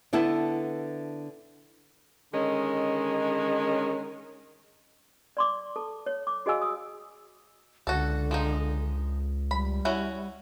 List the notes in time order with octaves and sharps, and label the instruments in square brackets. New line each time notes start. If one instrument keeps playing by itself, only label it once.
[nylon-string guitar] D3 B3 E4 A5
[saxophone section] D3 D#3 G#3 C#4
[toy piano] D5 C6 D6
A4 A5
C#5
D6
F#4 G#4 D#5 F5 G#5 E6
D#6
[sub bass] C#2 [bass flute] D3 [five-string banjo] F#4 A4
[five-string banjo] F3 G#3 D#4
[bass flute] G3 [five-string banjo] B5
[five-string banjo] C#4 E4 F#4